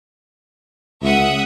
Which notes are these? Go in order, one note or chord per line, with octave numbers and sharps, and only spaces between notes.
C#2 E5 F#5 D#6